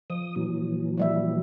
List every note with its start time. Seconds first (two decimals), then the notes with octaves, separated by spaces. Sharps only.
0.10 F3 D#6
0.36 A#2 E3 F#3
0.97 F3 G3 E5